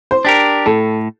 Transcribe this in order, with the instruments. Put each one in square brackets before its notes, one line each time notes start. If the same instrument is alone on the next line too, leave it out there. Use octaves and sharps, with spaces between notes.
[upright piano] C5
[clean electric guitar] D4 G4 A#4
[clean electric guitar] A2 [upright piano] A4